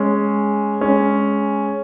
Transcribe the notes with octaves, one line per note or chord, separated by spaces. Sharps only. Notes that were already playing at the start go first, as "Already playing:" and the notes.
Already playing: G#3 C#4
G#3 C#4